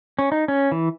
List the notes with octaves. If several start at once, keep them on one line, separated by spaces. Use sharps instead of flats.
C#4
D#4
C#4
E3